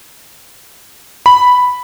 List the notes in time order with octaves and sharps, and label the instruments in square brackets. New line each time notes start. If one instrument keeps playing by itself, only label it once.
[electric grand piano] B5